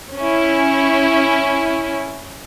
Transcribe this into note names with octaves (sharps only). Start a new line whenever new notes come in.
C#4 E4